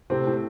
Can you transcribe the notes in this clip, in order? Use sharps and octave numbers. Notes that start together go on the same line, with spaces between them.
A2 C3 C4
A2